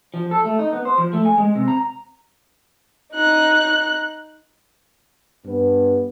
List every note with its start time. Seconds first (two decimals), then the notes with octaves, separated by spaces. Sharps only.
0.14 F3
0.31 A4
0.45 A3
0.59 D#4
0.73 B3
0.85 C5
0.98 F3
1.13 A3
1.25 G#5
1.38 G#3
1.55 C3
1.68 A#5
3.14 D#4 F#6
5.46 G2 B3